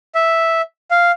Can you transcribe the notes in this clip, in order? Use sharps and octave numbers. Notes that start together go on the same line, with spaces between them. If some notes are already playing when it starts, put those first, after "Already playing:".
E5
F5